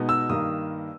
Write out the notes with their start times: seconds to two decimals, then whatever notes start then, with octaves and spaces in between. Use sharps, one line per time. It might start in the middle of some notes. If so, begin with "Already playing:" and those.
Already playing: B2 G#3 B3 D#4
0.09 E6
0.29 G2 D#3 A#3 D#6